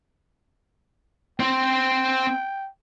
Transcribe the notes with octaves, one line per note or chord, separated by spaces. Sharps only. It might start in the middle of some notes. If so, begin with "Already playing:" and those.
C4 C5 G5